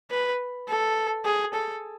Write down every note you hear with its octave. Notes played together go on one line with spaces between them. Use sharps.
B4
A4
G#4
A4